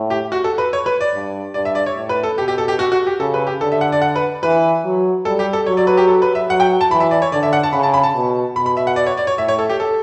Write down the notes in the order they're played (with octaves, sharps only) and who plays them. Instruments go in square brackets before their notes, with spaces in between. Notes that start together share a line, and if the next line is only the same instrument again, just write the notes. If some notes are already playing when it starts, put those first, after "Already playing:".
Already playing: [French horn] A2
[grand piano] G4
F#4
A4
B4
C#5
B4
D5
[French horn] G2
[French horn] G2 [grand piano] D5
[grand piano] E5
D5
C#5
[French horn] A2
[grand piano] B4
A4
[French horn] B2 [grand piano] G4
[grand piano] G4
A4
G4
F#4
F#4
G4
[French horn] C#3 [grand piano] A4
[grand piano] B4
G4
[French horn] D3 [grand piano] A4
[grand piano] E5
F#5
D5
F#5
B4
[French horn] E3 [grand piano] B4
[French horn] F#3
[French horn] G3 [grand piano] A4
[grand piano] G4
A4
[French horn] F#3 [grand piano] C#5
[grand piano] D5
B4
G4
A4
B4
E5
[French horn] F#3 [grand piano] F#5
[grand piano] G5
A5
[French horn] E3 [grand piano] B5
[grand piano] E5
D5
C#5
[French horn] D3 [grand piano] D5
[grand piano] E5
F#5
A5
[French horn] C#3 [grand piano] B5
[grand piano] A5
B5
A5
[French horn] B2
[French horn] B2 [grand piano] B5
[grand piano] B5
E5
F#5
D5
C#5
D5
C#5
[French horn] A2 [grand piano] E5
[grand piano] C#5
A4
G4
A4